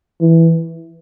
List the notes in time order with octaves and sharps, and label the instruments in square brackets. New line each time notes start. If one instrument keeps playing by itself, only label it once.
[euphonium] E3